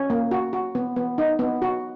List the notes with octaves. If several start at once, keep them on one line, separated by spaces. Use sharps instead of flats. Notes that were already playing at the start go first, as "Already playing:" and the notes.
Already playing: C#4 C#5
A#3
F#4
F#4
B3
B3
D#4
B3
F#4